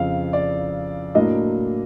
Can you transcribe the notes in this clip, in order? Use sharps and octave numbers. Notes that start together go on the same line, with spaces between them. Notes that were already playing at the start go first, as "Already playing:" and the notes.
Already playing: F2 C#3 F3 F5
D5
A2 F#3 A#3 D4 D#5